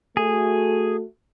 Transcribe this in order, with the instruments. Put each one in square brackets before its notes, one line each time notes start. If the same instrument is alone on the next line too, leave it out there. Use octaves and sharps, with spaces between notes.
[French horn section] A3 F#4 [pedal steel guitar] G#4